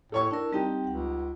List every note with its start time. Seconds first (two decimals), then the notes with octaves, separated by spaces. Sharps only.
0.12 A2 A4 C#5 C#6
0.31 D4 E4 A#4
0.52 G3 C4 D#4 G4 G5
0.87 C#2 F#5